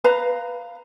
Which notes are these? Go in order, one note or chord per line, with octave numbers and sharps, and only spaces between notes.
B4 F5 A#5